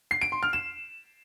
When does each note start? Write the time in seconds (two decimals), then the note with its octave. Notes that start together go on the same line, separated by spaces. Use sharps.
0.11 C7
0.21 D7
0.32 C6
0.43 F6
0.53 E7